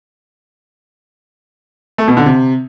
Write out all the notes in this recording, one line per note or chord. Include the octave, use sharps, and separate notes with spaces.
A3
B2
D3
C3